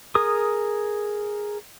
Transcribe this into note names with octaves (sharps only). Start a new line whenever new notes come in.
G#4 A#4 D#6